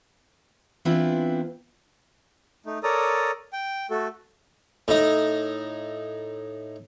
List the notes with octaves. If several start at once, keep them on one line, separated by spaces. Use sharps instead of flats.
E3 B3 C4 D4 E4 F4
A3 D#4
A4 A#4 C#5 D5 A#5 D#6
G5
A3 F#4 A4
A2 D#4